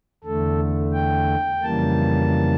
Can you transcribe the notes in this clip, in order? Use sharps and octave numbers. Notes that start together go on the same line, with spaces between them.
E2 D3 A3 A4
G5
F2 C#3 E3 G3 A#3 A5